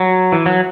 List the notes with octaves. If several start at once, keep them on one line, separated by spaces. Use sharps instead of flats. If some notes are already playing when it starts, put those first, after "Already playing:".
Already playing: F#3
E3
F#3